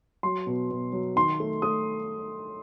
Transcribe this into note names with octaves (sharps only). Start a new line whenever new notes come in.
F#3 C6
B2
B2
F#3
D#3 C6
A3
A3 D#6